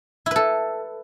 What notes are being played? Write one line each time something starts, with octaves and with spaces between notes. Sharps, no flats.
E4 A4 B4